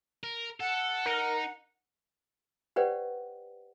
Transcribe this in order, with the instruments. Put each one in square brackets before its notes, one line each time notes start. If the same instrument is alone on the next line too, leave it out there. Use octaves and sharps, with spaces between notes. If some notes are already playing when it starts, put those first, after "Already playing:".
[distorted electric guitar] A#4
[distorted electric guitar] A4 [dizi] F#5
[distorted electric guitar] D#4 [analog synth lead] A#4
[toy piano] G4 B4 C5 D5 F#5 G5